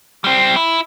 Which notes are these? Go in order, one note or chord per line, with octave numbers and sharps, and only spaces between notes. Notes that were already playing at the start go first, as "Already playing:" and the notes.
G3 C4
E4